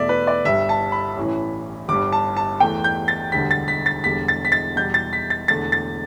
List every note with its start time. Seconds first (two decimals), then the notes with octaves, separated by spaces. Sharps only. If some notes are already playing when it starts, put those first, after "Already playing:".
Already playing: E2 B2 A3 D5 E5
0.09 B4
0.27 D5
0.44 G1 G2 G3 E5
0.69 A5
0.92 B5
1.17 A1 A2 E3
1.88 G1 G2 G3 D6
2.12 A5
2.37 A5
2.60 E2 E3 A3 G5
2.84 G6
3.08 A6
3.32 E1 D2 D3 G3 B6
3.51 A6
3.68 B6
3.86 A6
4.04 E1 E2 D3 G3 B6
4.28 A6
4.45 B6
4.52 A6
4.76 E2 B2 G3 G6
4.94 A6
5.13 B6
5.30 A6
5.48 E1 E2 D3 A3 A6
5.72 A6